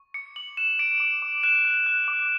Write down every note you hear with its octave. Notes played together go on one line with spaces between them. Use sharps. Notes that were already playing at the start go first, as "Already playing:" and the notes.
Already playing: C#6
D6 C#7
D6 F#7
F#6 E7
D6 D7
D6
D6
F#6 E7
F#6
F#6
D6